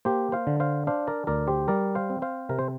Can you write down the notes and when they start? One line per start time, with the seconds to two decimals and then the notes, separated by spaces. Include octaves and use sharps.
0.05 A#3 G4 C5
0.32 C5 F5
0.47 D3
0.60 C5 F5
0.87 D4 C5 F5
1.07 A#4 D5
1.27 D2 A#4 D5
1.47 G4 C5
1.68 G3 A#4 D5
1.95 C5 F5
2.10 C4
2.22 C5 F5
2.49 C3 A#4
2.59 C5